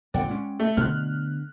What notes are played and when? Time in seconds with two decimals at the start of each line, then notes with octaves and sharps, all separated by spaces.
0.14 F2 A#2 D3 D5 F#5 G5
0.28 G#3 C#4
0.60 A3
0.77 B2 D3 A3 F6 F#6